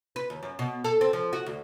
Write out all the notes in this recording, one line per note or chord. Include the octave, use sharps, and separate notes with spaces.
B4
D#2
F#2
B2
A4
C4
F3
F#4
D2